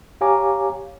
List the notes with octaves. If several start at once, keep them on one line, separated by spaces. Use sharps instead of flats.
G4 C#5 F5 G#5 A#5 D6